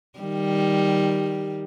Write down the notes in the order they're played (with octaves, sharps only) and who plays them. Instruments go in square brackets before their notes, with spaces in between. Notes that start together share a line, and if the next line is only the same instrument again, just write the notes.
[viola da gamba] D#3 G3